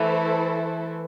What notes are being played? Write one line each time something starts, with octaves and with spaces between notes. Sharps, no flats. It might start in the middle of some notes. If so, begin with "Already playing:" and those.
Already playing: E3 A3 E4 A4 C5